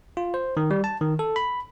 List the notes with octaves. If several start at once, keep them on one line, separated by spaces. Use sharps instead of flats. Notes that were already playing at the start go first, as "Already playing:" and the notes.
F4
C5
D#3
G3
A5
D#3
A4
B5